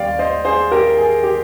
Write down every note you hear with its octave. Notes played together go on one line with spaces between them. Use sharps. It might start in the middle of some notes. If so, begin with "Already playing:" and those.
Already playing: D#2 D#3 G3 D5 F5 G5
C5 D#5
G#4 C5
G4 A#4
G#4
G4